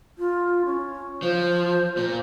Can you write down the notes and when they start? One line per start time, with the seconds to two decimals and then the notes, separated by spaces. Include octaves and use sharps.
0.18 F4
0.65 C#4
1.22 F3 C5
1.97 A#2 C5